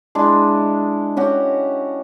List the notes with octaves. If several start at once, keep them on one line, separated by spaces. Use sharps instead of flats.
G#3 D4 E4
C#4 F#4 G4